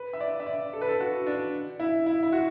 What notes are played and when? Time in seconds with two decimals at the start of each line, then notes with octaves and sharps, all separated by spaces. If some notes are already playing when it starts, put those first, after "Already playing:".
Already playing: B4
0.13 E5
0.20 D5
0.40 E5
0.46 D5
0.73 A4
0.81 B4
0.89 A4
1.00 F#4
1.27 D4
1.80 E4
2.06 E4
2.23 E4
2.32 F#4